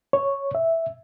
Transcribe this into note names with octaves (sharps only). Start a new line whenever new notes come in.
C#5
E5